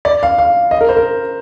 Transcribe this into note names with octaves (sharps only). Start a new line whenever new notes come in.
D5
F5
F5
D#5
A#4
C5
A#4